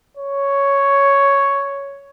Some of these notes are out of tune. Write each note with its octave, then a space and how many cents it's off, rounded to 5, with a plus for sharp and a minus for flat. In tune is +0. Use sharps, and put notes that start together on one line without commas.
C#5 +5